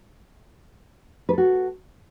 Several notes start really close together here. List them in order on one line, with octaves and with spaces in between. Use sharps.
B4 A4 F#4